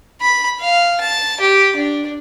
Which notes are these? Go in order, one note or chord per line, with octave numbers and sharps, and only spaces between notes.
B5
F5
A5
G4
D4